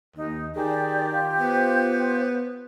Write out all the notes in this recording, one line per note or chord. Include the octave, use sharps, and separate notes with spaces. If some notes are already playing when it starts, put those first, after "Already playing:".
D#2 D#4
D#3 G4 G#4 D5
F4
B3 C5